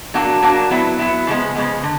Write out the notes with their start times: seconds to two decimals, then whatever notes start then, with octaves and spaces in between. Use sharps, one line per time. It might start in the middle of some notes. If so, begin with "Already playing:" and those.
0.14 F#3 A#3 D4 F#4
0.42 F#3 A#3 D4 F#4
0.70 F#3 B3 E4
0.99 F#3 B3 E4
1.27 C#3 F3 G#3 B3
1.55 C#3 F3 G#3 B3
1.83 D3